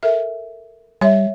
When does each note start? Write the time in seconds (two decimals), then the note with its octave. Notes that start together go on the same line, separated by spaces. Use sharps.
0.03 A4 A#4 E5
1.01 G3 C#5 E5